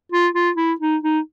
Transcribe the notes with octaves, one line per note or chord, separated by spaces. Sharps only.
F4
F4
E4
D#4
D#4